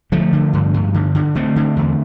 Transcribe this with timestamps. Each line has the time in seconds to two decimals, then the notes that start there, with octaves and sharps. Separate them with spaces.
0.12 D3 F3 A3
0.33 D3
0.53 G2
0.74 G2
0.94 D3
1.15 D3
1.35 D3 A3 C4
1.56 D3
1.76 E2